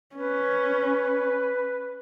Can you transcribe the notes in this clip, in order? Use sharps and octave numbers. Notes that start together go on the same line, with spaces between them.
C#4 B4